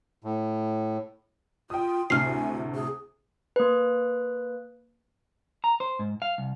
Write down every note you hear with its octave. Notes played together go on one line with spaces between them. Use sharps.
A2
F4 G5 D#6
D2 A2 C3 G#5 F6 C7
G#4
A#3 B4
A#5
C5
G#2
F5
C2